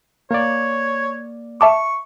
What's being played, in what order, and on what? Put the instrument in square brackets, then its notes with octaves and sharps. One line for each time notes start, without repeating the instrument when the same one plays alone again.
[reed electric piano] A#3 D5 [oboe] C#5
[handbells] E5 A5 D6 [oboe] C#6